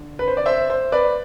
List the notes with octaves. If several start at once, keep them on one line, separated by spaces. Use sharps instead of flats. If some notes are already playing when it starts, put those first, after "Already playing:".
Already playing: D3
B4
C5
D5
C5 E5
C5
B4 D5